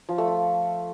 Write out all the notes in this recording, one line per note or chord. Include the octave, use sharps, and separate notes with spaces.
F3
A3
F4